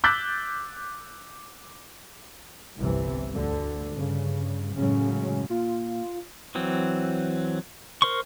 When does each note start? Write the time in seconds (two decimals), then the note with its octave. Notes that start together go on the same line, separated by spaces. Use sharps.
0.04 D6 E6 F#6 G6 A6 B6
2.79 G1 C2 C3 E3
3.33 D2 D3
3.92 G2 C#3
4.75 F#2 A2 C#3 F#3 G#3 C#4
5.50 A#2 F4
6.55 E3 F#3 C4
8.02 A#4 C5 C6 C#6